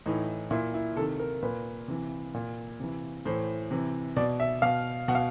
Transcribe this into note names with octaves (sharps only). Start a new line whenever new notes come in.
A2 E3 D#4
A#2 E4
E4
C3 D#3 A4
A#4
A#2 B4
C3 E3
A#2
C3 E3
A2 E3 C5
C3 E3
B2 D5
E5
B2 F5
B2 F#5
F5